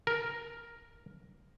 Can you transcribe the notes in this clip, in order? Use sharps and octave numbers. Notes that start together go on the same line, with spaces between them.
A#4